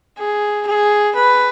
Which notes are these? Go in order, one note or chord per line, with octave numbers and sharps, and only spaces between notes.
G#4
G#4
B4